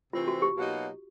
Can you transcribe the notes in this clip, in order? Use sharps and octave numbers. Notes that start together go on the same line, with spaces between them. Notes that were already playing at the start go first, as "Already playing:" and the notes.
C3 E3 A3 C4 F4
F#4
G4
B2 F#3 A#3 D#4 F#4